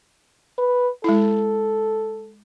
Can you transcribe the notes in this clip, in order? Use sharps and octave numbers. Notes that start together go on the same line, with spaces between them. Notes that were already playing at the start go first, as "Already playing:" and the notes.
B4
G#3 E4 A4